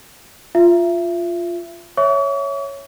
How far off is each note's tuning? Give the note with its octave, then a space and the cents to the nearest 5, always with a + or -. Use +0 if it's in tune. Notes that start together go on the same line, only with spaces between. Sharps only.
F4 +0 E5 +25
C#5 +0 E5 +0 C#6 +45